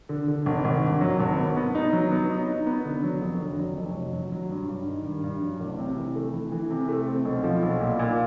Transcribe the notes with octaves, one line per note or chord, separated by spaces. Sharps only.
D3
D3
G#1
G#1
G2
F#3
G#1
B3
B3
D#4
F#3
B3
D#4
D#4
B3
D3
F#3
F2
D3
F#3
F1
F#3
F#3
F#3
G2
G2
D#3
G2
G2
F#3
A1
C3
E3
A3
E3
E3
C3
A3
C4
B1
F3
B1
A#2
A#2